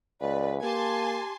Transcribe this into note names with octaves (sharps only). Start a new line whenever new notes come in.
C#2 B4 D5
A#3 G4 G#5 A5 C6